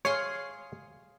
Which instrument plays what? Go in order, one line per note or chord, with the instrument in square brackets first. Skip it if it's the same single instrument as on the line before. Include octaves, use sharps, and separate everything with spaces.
[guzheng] G#4 F5 C6 [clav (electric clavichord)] C#5